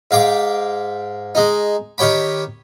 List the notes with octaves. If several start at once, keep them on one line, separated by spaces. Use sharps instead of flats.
G#2 F5 G5 D6
G#3 D#4
D#3 G4 C#5 G5 B5